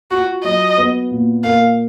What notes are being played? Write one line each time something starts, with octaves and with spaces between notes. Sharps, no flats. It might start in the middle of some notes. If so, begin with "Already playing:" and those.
F4 F#4
F#3 D#5
B3
A#2
A#3 F5